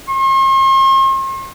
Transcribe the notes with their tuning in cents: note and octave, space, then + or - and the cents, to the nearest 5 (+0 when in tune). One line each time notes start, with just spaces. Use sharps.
C6 +45